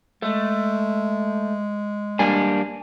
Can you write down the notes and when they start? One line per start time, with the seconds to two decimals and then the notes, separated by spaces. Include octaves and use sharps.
0.22 G#3 A3
2.19 G3 A#3 D4 G#5